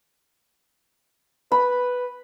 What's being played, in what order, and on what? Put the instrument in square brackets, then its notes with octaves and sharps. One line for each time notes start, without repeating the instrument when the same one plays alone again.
[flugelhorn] B4 [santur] B5